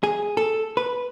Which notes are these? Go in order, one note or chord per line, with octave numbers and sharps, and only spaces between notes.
G#4
A4
B4